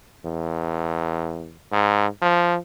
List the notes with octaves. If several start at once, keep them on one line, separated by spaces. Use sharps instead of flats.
E2
G#2
F3